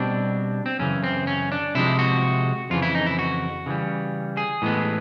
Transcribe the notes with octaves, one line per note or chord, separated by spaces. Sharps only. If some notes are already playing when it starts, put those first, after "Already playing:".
Already playing: B2 G3 C4 D4
C4
F#2 C#3 E3 C#4
C4
C#4
D4
C3 F3 G#3 E4
F#4
F2 C#3 E3 F4
E4
D#4
E4
F#4
C#3 E3 G3
G#4
A2 E3 G#3 B3